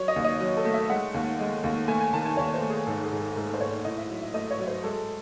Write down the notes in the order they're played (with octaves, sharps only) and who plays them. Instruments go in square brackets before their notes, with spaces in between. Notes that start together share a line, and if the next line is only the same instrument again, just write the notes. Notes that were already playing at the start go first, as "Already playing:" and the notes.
Already playing: [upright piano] F#3 C#5
D#5
D#2
D#5
F#3
A4
A3
E5
G#3 F#5
D#2
G#3
D#2
A3 G#5
G#5
D#3 A5
G#5
D#2 C#5
C5
A3
G#4
G#2 A4
G#4
G#2
A4
G#2 A4
C5
G#2 C#5
A2 D#5
E5
F#3
E5
A3 D#5
C#5
F#3
C5
G#3 A4